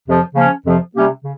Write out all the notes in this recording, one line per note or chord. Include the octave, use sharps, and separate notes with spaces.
F2 C3 F3
C#3 F3 A#3 C#4
F2 C3 F3
C3 G3 A#3 C#4 G4
C#3